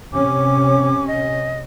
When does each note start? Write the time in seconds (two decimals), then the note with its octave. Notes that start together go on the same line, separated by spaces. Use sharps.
0.13 C3 C#4 D6
1.07 D#5